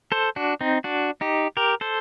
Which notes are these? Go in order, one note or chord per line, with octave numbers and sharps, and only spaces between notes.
A4 C5
D4 F#4
C4 D#4
D4 F#4
D#4 G4
G4 A#4
A4 C5